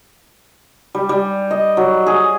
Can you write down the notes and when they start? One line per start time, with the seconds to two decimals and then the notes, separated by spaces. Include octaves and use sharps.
0.95 G3
1.09 G3
1.51 D#5
1.77 F#3
2.07 G#4